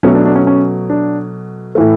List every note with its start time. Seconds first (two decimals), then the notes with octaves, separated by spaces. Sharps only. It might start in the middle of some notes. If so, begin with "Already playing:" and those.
0.03 B2 F#3 A3 C#4
0.15 D4
0.26 D4
0.36 C#4
0.47 C#4
0.90 D4
1.75 A2 E3 A3